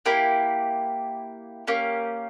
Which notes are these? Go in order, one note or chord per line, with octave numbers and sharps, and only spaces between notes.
A#3 E4 G4
A#3 C#4 G4